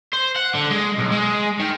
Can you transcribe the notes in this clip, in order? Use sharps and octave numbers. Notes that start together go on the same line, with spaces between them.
C5
F#5
D3
G#3
B1
G#3
D#3